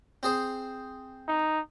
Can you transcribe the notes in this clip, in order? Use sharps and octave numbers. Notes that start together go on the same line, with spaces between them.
C4 G#4 C5
D#4